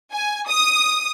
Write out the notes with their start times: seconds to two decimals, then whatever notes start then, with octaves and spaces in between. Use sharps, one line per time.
0.13 G#5
0.48 D#6